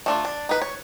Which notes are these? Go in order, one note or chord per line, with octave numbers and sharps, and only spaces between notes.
A3 D4 F4
D4
D#4 B4
C#5